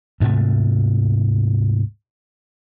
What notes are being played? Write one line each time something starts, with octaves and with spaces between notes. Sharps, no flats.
D2 G#2 C3 A3